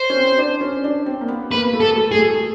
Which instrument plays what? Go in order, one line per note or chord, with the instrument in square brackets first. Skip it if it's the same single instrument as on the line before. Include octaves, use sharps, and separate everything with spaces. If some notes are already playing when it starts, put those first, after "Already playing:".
Already playing: [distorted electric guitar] C5
[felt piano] C#4
C4
D4
C#4
D4
C4
A#3
B3
[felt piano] A#3 [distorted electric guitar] B4
[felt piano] A3
[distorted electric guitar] A4
[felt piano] A3
[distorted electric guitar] G#4
[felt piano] A3